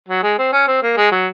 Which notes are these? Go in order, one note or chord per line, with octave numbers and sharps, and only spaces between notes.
F#3
G#3
C4
C#4
C4
A#3
G#3
F#3